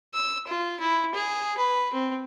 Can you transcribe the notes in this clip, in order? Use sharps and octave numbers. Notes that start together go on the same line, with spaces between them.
E6
F4
E4
G#4
B4
C4